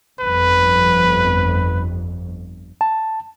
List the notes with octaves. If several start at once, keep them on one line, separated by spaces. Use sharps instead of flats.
G1 F2 B4
A5